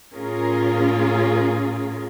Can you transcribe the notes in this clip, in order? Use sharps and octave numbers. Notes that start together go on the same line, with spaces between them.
A2 C#4 F4 G#4 A#4